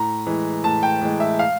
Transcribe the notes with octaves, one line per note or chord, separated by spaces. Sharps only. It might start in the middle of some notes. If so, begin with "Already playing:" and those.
Already playing: A2 A#5
E3 G#3
A2 A5
G5
E3 G#3
E5
F5